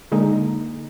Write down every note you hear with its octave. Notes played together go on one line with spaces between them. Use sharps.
D3 G#3 A#3 D#4